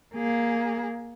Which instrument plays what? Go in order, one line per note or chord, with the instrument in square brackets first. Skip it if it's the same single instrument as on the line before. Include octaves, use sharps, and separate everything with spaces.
[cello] A#3 G#4